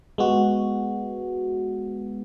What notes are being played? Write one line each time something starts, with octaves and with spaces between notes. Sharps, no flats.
G#3 B3 F#4